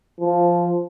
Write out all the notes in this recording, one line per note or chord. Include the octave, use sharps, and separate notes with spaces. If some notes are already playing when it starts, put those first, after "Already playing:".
F3